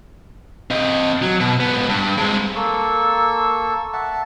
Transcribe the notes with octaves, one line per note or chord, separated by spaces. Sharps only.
C4 D#5
F#3
B2
G#2 B3
G2
G#3 C4
A#3 A4 C#6 E6
E5 F#5 A5